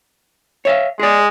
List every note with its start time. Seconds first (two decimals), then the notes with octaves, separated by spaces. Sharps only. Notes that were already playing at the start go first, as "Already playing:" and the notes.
0.65 C#5 E5 F5
1.00 G#3 G#4 D5